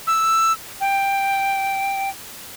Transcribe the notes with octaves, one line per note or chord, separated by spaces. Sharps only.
E6
G5